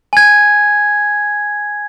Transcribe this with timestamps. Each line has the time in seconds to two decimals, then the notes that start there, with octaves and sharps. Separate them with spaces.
0.13 G#5 G#6